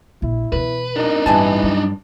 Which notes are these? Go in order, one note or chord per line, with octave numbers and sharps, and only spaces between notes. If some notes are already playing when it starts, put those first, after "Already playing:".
A#1 E4
B2 E3 B4
D4 D#4 A#4
A1 G2 E3 G#5 A5
F#3